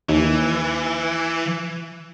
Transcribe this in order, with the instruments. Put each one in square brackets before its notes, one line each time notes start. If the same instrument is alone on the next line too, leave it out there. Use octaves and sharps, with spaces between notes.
[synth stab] D#2 [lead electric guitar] E3